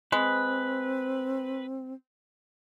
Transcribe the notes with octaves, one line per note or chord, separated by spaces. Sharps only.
G#3 C4 B4